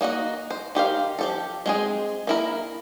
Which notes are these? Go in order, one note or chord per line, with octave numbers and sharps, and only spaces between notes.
A#3 D#4 F#4 D#5
C5
D#3 G4 C5 F5
F3 G4 A4
G#3 C4 G#4
A#3 E4 A#4